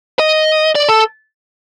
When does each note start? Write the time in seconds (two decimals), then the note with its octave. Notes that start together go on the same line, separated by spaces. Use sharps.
0.19 D#5
0.75 D5
0.88 A4